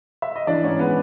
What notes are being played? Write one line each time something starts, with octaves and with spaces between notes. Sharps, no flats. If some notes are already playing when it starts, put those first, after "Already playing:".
E5
D#5
E3 D4 D5
G#2 C#4 C#5
G#3 B3 B4